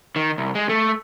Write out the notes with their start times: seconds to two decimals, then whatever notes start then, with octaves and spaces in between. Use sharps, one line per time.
0.16 D#3
0.38 C2
0.55 G#3
0.69 A3